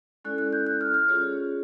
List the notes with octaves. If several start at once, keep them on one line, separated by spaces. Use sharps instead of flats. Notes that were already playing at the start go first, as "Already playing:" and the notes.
G#3 C#4 E4 A4 D5 F#6
F#6
G6
F#6
F6
F6
C#4 F4 G#4 C#5